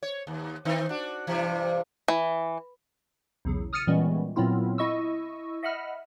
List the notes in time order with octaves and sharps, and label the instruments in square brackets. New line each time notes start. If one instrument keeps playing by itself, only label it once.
[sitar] C#5
D#2
D#3 C4 D#4
D4 F#4
G2 C3 E3
[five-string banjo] E3
[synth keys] B1 E2 C#3
D#6 F6 A6 C#7 D#7
A#2 E3 G3 G#3 B3 C#4
A#2 F#3 B3 C4 E4 F4
E4 D#5 C#6 E6
D#5 E5 F#5 B5 F6